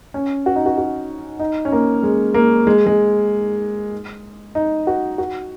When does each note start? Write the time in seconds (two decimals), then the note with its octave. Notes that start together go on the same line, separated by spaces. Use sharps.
0.14 C#4
0.46 F#4
0.56 D#4
0.66 F#4
0.78 F#4
1.40 D#4
1.65 C#4
1.72 A#3
2.03 G#3
2.34 A#3
2.67 G#3
2.86 G#3
4.55 D#4
4.87 F#4
5.18 F#4